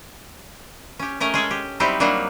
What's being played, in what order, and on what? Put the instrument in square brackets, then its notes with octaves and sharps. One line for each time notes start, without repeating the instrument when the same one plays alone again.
[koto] C#4 G4
A3 C#4 A#4 D#5
G#3 G#4 A4
G4
F#3 G3 C4 D#4 E4 G4
F#3 G3 A#3 D4 D#4